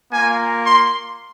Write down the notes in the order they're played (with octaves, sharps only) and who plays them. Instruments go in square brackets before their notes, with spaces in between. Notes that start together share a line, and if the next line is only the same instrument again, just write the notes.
[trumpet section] A#3 F4 G#5
C6